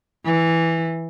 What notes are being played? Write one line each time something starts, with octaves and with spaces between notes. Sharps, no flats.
E3